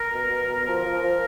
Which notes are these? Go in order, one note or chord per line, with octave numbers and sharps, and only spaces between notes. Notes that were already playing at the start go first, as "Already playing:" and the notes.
Already playing: A#4
B2
B2
B2
F3 A#4
F3
F3